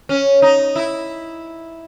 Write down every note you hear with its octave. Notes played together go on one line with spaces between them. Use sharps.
C#4
D#4
E4